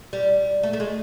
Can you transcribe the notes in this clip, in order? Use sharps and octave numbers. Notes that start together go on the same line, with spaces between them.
G3
A3
A3
G#3